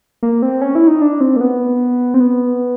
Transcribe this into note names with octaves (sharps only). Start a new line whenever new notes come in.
A#3
C4
C#4
E4
D#4
D4
C4
A#3
B3
C4
B3